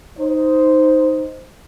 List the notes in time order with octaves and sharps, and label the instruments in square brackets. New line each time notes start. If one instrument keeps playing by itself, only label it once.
[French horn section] D#4 C5